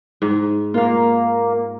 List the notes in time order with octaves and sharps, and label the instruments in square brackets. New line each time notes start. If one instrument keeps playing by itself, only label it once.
[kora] G#2
[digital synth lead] A#3 [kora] F4 F5